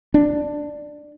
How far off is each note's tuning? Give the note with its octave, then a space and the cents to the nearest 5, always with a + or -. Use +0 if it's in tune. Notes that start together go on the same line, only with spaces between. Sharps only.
D4 +10